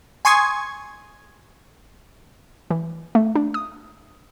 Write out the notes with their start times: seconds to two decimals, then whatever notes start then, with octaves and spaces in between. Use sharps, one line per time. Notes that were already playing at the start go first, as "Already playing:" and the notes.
0.25 G#5 C6 C#6 D#6 G#6
2.70 E3
3.15 A3
3.35 D4
3.54 D#6